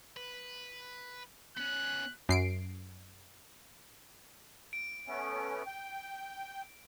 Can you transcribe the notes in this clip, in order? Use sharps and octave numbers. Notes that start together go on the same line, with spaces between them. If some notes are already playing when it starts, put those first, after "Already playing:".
B4
B3 C#4 F#6
F#2 C7 D7
D7
A3 B3 C#4
G5